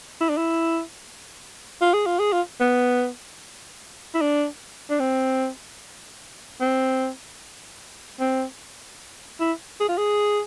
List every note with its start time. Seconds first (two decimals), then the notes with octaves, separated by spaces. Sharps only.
0.21 E4
0.30 D4
0.37 E4
1.82 F4
1.94 G#4
2.06 F4
2.19 G#4
2.33 F4
2.60 B3
4.15 E4
4.21 D4
4.90 D4
5.00 C4
6.61 C4
8.20 C4
9.40 E4
9.81 G#4
9.89 F4
9.98 G#4